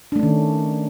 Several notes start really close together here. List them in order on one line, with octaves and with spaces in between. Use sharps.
D4 A3 C#4 D#3